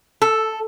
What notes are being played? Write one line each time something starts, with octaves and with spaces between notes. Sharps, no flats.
A4